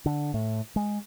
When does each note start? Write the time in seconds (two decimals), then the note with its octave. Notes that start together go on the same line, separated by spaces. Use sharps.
0.06 D3
0.34 A2
0.76 G#3